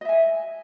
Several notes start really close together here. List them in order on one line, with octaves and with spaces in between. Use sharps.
D#5 E5 G#5